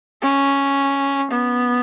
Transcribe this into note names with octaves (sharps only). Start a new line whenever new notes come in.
C#4
B3